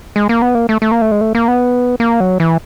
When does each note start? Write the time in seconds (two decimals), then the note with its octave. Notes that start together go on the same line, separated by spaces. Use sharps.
0.16 G#3
0.29 A#3
0.42 B3
0.55 A#3
0.69 A3
0.82 A3
0.92 A#3
1.01 A3
1.11 G#3
1.21 A3
1.35 A#3
1.48 B3
2.00 A#3
2.20 F#3
2.40 E3